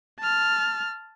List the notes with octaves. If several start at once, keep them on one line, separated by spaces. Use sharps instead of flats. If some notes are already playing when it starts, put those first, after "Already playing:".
A5 F6